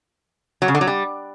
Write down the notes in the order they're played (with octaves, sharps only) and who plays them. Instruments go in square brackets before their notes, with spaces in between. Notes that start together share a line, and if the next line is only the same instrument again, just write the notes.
[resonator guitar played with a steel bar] F#3
C#3
D3
F#3
G3